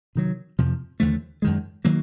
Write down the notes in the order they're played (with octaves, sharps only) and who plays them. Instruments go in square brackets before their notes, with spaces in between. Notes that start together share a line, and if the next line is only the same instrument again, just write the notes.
[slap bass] C3 D#3 F#3
F2 C3 F3
D#2 D3 F3 A3
F#2 D#3 G#3
D#3 F#3 A#3